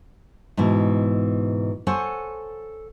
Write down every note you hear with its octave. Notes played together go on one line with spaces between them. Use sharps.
G#2 B2 E3
A4 C5 C#5 F#5 G#5